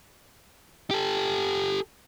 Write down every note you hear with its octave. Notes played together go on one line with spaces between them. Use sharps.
G4 A4